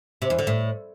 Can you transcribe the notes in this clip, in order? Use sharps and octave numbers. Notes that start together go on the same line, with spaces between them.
C3
E2
D3
A2